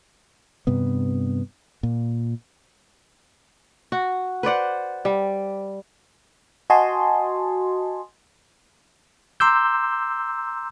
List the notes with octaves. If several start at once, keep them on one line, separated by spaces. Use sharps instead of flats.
G2 C3 B3
A#2
F#4
B4 C5 D5 F#5
G3
F#4 D#5 G#5 A5 C6
A#5 C6 D6 E6 G6